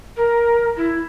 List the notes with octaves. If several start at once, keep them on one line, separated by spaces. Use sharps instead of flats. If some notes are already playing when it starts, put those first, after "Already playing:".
A#4
E4